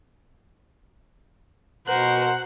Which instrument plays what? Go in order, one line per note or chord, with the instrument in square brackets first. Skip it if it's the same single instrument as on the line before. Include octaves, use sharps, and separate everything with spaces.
[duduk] B2 [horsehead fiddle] A#4 C5 [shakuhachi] F#5 [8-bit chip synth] F#6